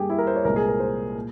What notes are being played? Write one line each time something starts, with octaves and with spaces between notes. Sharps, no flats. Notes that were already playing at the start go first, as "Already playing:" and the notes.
Already playing: G2 G3 A#3 G4 G#4
E4
A#4
C5
C#5
C2 A#2 G#3 C4 A#4
G#4
A#4
C5
A#2